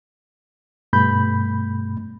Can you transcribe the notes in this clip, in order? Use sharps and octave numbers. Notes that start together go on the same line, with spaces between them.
G2 B2 A3 B5 G6